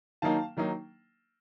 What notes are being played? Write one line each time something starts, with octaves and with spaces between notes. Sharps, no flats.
D#3 F#3 A#3 D#4 F5 A5
D#3 F#3 A#3 D#4